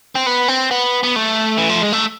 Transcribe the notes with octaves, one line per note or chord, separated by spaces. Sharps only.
C4
B3
C4
B3
B3
A3
E3
F3
G#3
A3